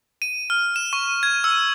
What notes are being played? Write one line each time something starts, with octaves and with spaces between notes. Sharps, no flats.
D#7
F6
E7
C#6
G#6
E6